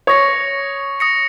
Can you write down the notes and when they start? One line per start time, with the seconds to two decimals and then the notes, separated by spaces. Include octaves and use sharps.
0.07 C#5 D#6 A#6 C#7
1.00 D#6 A#6 C#7